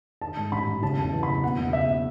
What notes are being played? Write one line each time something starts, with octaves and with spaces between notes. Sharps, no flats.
D#3 A5
G#2
A1 B5
A1
C#3 A5
E2 A5
E3
F#1 B5
B2 F#5
E2
F#1 E5